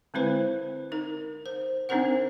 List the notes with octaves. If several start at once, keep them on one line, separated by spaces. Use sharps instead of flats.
D3 G#3 C4 E4 B4 C5
D#4 A#4
C5
C4 D4 D#4 A#4 C5 F#5